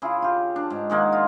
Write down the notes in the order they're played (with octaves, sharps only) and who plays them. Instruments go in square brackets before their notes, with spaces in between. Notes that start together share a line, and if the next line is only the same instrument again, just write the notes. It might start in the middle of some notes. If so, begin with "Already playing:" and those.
[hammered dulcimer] C#3 E4 F4 G#4
F4 G4
D4
G#2
D#3 G#3 A#3 F#5
F4